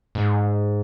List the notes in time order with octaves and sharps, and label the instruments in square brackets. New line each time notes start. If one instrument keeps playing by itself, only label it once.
[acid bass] G#2